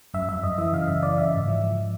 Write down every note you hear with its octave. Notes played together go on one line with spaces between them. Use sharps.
F#2 E5
F#2 E5
F#2 D#5
E3 E5
C#3 F5
F#2 E5
E3 D5
C#3 E5
G#2
F3
F3